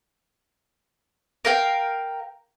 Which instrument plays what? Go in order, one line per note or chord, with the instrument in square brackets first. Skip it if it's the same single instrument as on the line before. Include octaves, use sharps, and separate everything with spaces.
[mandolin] A#4 F5 G5